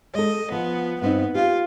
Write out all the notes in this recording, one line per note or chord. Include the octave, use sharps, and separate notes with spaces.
G#3 A4 D#5
F3 B3
G2 B3 C4 D#4
F4 G4